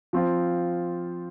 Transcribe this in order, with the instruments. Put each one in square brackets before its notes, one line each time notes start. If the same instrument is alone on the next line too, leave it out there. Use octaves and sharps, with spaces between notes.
[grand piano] F3 C4 F4